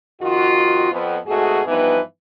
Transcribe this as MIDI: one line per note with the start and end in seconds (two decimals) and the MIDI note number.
0.22 0.91 41
0.22 0.91 51
0.22 0.91 65
0.22 0.91 66
0.92 1.18 41
0.92 1.18 59
1.27 1.61 44
1.27 1.61 47
1.27 1.61 57
1.27 1.61 66
1.27 1.61 68
1.67 1.99 43
1.67 1.99 52
1.67 1.99 53
1.67 1.99 59
1.67 1.99 63
1.67 1.99 71